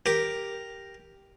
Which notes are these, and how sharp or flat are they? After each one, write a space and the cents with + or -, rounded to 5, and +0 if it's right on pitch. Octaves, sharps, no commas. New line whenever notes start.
G4 +0 A#4 +0